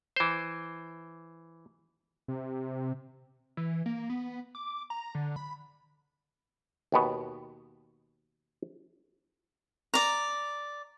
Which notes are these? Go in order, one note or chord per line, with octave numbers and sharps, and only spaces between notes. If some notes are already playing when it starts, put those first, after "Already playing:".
E3 C5
C3
E3
A#3
B3
D6
A#5
D3
B5
D#2 B2 B3
D5 A#5